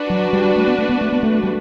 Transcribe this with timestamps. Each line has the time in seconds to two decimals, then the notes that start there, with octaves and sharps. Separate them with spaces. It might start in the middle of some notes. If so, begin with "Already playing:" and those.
Already playing: D4 F#4 B4
0.10 F#3
0.33 G3
0.56 A3
0.68 B3
0.78 A3
0.89 B3
1.01 A3
1.12 B3
1.23 A3
1.43 G3